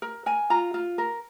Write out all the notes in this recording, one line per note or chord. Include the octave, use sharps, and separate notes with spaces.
A#4
A#4 G#5
F4 A#5
F4
A#4